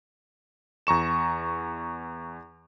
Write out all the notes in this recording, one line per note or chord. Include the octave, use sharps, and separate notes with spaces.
E2 A#5 C#6 E7